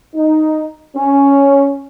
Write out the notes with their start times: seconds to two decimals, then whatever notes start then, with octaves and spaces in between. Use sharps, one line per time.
0.14 D#4
0.96 C#4